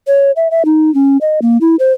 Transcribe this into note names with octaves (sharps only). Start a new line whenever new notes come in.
C#5
E5
E5
D#4
C#4
D#5
A#3
E4
C5